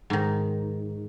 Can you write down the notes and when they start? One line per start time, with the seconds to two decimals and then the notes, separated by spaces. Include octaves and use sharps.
0.10 G#2 D#3